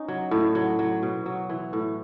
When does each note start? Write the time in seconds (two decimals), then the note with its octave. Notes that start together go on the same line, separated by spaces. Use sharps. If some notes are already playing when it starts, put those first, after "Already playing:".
Already playing: C#4 D#4
0.08 F#3
0.31 A2
0.55 F#3
0.79 F#3
1.03 B2
1.26 F#3
1.49 E3
1.73 A2